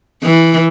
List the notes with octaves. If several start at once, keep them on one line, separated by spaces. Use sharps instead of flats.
E3